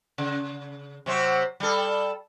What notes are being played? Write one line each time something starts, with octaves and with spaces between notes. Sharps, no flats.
C#3
C3 F#3 C4
G3 A4